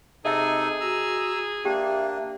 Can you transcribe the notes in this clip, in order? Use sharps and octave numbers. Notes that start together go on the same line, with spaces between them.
C3 D#4 G#4 A4 D#5 E5
F#4 A#5 E6
A#3 D4 G4 E5 G5